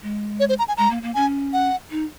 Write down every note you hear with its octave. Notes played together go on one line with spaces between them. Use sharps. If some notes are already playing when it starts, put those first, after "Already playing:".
G#3
C#5
C5
A#5
G#5
G#3 A#5
A#3
A#3
C#4 G#5
F#5
D#4